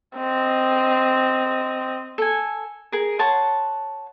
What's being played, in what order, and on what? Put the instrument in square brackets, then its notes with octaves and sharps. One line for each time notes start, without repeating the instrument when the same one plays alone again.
[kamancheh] C4 D#5
[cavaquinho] A4 G#5
G#4 A#4
C#5 F#5 A5 C6